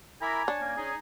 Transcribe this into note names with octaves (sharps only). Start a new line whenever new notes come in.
E4 A#4 G#5 A#5 B5 D6
D4 C#5 A5
A#3 C#4
C#4 D#4 G#4